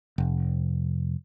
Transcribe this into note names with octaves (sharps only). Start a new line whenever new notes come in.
F1